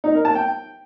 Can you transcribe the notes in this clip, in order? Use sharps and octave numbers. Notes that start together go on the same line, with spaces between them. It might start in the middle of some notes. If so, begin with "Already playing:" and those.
D#4
A#4
A5
G5